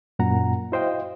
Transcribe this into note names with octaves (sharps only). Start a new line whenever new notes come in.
F#2 A#2 F#5 A#5
E4 F#4 C5 D#5 F5 G5